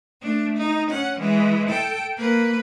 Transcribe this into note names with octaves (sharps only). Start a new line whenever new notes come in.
A3 D4
D#4
C#4 F#5
E3 G#3
A4 G5
A#3 B4